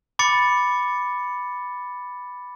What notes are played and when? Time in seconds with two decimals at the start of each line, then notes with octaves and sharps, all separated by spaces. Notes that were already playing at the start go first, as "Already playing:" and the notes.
0.19 B5 D6 A6 C#7